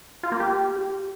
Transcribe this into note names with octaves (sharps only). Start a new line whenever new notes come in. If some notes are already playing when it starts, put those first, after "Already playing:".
F4
A#3
G4